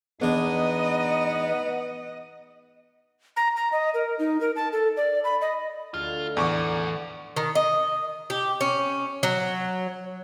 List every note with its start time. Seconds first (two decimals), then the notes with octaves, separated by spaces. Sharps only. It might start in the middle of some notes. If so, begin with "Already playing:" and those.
0.22 E2 B3 D4 D#4 D#5
3.36 A#5
3.56 A#5
3.72 D#5
3.94 A#4
4.19 D#4
4.41 A#4
4.56 A5
4.72 A4
4.97 D5
5.24 B5
5.41 D#5
5.94 D2 F4 A4
6.37 E2 A2 D#3 E3 D5 F#5 C#6 D6
7.36 D#3
7.55 D#5
8.30 G4
8.61 C#4
9.23 F#3